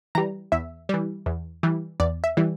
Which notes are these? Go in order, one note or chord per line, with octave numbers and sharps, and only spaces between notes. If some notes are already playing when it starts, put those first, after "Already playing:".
E3 G3 A#5
E2 E5
E3 G3
E2
E3 G3
E2 D5
E5
E3 G3